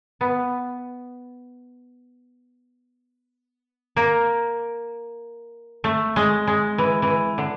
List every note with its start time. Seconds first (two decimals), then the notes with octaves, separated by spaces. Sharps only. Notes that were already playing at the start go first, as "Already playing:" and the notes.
0.21 B3
3.96 A#3
5.84 A3
6.16 G#3
6.47 G#3
6.78 E3
7.02 E3
7.38 D3